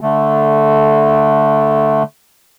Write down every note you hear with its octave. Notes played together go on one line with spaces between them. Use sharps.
D3 A3